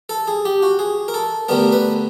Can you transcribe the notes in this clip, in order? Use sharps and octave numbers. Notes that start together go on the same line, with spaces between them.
A4
G#4
G4
F#4
G#4
A#4
A4
D2 D3 G3 B3 A#4
B4